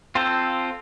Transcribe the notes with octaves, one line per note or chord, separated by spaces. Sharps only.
C4 F4 A4 C5